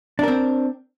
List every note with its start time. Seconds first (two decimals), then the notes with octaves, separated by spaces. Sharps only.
0.19 D4
0.23 A#4
0.28 C4